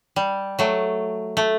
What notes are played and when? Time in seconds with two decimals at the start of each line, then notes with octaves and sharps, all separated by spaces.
0.16 G3
0.59 F#3 A3
1.37 A3